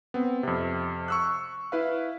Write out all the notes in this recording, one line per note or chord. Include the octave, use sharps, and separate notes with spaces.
B3 C4
F2 C3
C#6 E6 F#6
E4 B4 F5